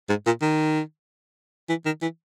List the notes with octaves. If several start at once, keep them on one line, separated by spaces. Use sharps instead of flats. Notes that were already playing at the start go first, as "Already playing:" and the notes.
G#2
A#2
D#3
E3
D#3
E3